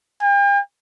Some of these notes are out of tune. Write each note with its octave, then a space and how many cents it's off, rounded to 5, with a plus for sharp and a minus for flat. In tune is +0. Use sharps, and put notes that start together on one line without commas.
G5 +45